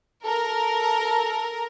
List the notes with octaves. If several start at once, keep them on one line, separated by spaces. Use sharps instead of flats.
A4 A#4